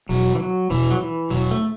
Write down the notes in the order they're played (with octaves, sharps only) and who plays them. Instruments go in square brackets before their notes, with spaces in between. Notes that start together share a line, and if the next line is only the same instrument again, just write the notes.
[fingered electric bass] E1 E2 B2 [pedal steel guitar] F#3
[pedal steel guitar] E3
F#3
[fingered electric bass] E1 E2 B2 [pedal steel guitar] E3
[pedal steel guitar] F#3
E3
[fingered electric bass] E1 E2 B2 [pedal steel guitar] F#3
[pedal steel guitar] A3